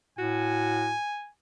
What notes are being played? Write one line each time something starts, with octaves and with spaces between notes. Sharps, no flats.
A2 F#4 G#5